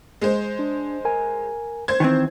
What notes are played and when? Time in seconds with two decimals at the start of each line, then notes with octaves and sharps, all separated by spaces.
0.22 G#3 C5
0.59 D4
1.05 A#4 G#5
1.88 C5 G#6
2.00 D#3 E3 C4